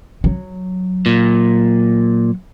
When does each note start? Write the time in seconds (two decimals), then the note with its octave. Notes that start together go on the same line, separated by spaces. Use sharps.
0.24 F#3
1.06 A#2